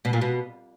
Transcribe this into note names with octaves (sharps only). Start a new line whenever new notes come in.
B2
A#2
B2